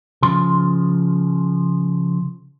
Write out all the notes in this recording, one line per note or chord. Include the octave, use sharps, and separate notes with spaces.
C#3 F3 C6